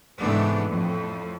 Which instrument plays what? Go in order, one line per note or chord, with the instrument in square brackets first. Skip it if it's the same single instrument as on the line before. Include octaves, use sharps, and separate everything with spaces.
[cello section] G#2 C3 E3 A3 B3 D4
F2 A2